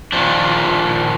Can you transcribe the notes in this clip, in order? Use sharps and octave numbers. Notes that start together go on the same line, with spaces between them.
A#2 D#3 F3 D4